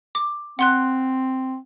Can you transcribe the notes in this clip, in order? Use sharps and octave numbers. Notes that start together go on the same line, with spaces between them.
D6
C4 F#5 C6 F#6